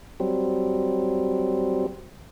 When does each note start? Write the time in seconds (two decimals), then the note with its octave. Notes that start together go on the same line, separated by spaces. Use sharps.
0.20 F#3 G3 C4